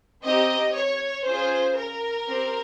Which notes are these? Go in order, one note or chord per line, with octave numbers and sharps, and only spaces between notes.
C4 D#4 G4 D#5
C#5
C#4 F4 G#4 C5
A#4
C4 G4